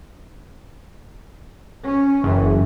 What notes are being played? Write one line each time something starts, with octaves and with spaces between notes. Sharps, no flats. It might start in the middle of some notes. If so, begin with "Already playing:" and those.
C#4
F#1 F#2 E3